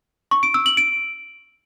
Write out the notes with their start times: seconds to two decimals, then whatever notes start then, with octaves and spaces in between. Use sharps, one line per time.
0.31 C#6
0.43 D7
0.54 E6
0.66 F#7
0.77 D7